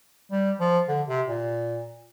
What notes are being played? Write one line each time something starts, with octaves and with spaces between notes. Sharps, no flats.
G3
F3
D3
C3
A#2